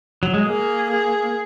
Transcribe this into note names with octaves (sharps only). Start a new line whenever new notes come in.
F#3
G#3
A#3 G#4
G#4